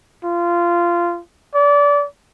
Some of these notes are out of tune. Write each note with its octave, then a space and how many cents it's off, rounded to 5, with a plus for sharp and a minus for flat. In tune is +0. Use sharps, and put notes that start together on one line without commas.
F4 -15
D5 -25